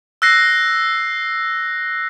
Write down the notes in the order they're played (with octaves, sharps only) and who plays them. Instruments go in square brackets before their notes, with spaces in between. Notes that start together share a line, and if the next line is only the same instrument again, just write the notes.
[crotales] E6 F#6 A#6 C7